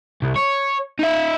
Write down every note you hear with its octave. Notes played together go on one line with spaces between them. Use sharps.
C2
C#5
D#4 E5